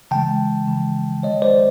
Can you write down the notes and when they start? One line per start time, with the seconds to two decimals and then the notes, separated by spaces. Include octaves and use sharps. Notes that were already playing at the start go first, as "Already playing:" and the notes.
0.11 C#3 E3 G#3 G5 A5
0.67 C#3 E3 G#3
1.23 D#3 G#3 C#5 D#5
1.42 C5 D5